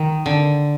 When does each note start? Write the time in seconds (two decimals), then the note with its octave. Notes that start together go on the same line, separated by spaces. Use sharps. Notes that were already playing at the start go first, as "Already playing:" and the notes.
Already playing: D#3
0.26 D3